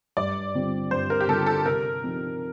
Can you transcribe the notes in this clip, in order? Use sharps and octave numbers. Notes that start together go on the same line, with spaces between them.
G2 D5
D3 G3 C4 F4
G2 C5
A#4
G4
D3 G3 C4 F4 A4
A4
C3 A#4
F3 C4 D#4